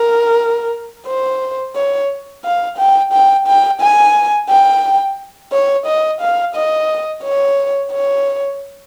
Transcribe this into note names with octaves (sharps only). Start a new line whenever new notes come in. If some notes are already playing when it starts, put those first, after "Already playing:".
Already playing: A#4
C5
C#5
F5
G5
G5
G5
G#5
G5
C#5
D#5
F5
D#5
C#5
C#5